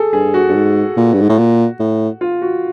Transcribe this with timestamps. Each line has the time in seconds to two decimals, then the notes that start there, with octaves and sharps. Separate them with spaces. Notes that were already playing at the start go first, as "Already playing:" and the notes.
Already playing: G#4 A4
0.13 G2 G#4
0.34 F#4
0.49 G2
0.55 G#2
0.97 A#2
1.13 G2
1.21 G#2
1.29 A2
1.38 A#2
1.80 A2
2.21 F4
2.42 F#4